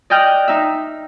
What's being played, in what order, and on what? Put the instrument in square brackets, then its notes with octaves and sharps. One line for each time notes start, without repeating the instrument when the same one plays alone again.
[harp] D5 D#5 G5 F6 F#6
D#4 E5